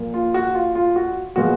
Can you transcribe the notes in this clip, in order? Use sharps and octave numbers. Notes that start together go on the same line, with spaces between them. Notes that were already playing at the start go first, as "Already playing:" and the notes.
Already playing: A#2 F3 A#3
F4
F#4
F4
F4
F#4
A#2 F3 G#3 B3 F#4